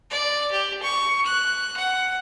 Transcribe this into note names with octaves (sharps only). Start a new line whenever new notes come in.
D5
G4
C#6
F#6
F#5